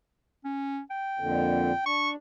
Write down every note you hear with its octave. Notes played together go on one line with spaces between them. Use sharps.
C#4
G5
F2 A#2 D3
D4 C#6